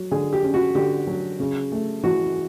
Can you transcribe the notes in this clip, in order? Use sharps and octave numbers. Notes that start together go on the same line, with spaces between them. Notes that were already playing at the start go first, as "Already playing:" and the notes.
Already playing: F#3
D3 G#4
G4
C#4
F#4
D3 G4
F#3
C#3
A3
E3 F#4